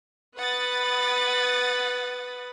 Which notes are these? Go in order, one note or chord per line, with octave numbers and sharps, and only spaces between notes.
B4 F#5 B5 D#6 A6